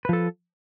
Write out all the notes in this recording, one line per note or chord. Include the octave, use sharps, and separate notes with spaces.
F3 A4 B4